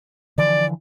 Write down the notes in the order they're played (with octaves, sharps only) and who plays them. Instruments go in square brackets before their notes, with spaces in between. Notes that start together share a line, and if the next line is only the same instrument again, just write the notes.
[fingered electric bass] D3 E3 F3 [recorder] D5